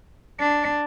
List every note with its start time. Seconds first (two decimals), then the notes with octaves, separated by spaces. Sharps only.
0.39 D4